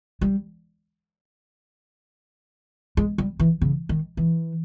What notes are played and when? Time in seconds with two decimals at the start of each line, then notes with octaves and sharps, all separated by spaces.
0.21 G3
2.97 G#3
3.18 G3
3.40 E3
3.61 C#3
3.89 D#3
4.17 E3